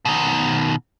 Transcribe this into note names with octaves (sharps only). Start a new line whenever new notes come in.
B2 D#3